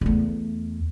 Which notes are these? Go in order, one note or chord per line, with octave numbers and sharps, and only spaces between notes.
E2 A3